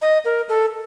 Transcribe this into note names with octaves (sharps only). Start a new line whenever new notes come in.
D#5
A#4
A4